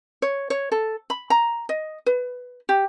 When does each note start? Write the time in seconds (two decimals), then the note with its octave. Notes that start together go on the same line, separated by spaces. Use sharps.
0.22 C#5
0.50 C#5
0.72 A4
1.10 B5
1.30 A#5
1.69 D#5
2.06 B4
2.69 G4